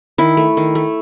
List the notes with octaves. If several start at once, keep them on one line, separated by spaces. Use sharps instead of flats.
D#3 E4
A3
D#3
A3